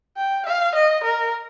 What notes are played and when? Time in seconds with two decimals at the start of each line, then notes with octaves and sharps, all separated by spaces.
0.17 G5
0.46 F5
0.75 D#5
1.04 A#4